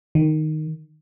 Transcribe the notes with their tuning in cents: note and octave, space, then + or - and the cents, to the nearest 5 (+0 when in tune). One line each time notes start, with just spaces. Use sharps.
D#3 -5